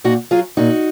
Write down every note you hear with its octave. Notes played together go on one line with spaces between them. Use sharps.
A#2 D#4 F#4
F#3 F4 G#4
A#2 D#4 F#4